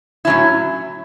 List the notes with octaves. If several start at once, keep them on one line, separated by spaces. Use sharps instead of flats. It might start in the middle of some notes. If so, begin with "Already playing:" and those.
A2 F#3 C#4 E4